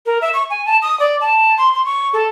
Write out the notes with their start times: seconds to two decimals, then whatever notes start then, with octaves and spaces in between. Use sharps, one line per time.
0.06 A#4
0.22 E5
0.34 C#6
0.50 G#5
0.66 A5
0.82 D#6
1.00 D5
1.21 A5
1.58 C6
1.73 C6
1.85 C#6
2.13 A4